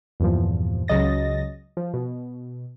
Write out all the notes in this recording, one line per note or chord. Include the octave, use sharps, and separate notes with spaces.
E2 G2 A#2 F3
C#2 C#3 F#3 D#5 A6 A#6
F3
B2